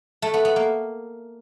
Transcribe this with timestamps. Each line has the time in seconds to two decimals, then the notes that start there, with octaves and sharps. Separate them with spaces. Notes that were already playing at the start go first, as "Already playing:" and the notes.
0.22 A3
0.34 B3
0.45 B3
0.56 A#3